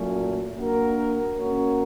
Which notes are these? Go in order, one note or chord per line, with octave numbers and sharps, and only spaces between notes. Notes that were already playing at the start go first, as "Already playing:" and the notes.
Already playing: A#2 F#3 A3 C#4
A#3 D4 F#4 A#4
A#3 C#4 F#4 A#4 C#5